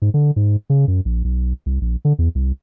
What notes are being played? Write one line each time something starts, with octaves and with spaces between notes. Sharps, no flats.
G#2
D3
G#2
C#3
F#2
A#1
B1
C2
A#1
D3
E2
C2